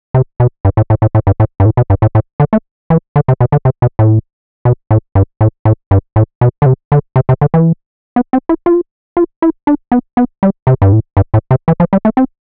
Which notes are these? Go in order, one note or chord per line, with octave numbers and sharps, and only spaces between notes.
C3
B2
G2
A2
A2
A2
A2
G2
A2
G2
A2
B2
G2
A2
A2
D3
A3
E3
D3
C3
B2
D3
C3
B2
A2
B2
A2
G2
A2
A2
G2
A2
B2
D3
C3
D3
C3
C3
D3
E3
B3
C4
E4
F4
F4
E4
D4
B3
B3
G3
C3
G2
A2
G2
A2
C3
E3
F3
G3
A3
C4